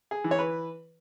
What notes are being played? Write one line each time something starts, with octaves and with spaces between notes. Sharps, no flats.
G#4
E3
C#5
B4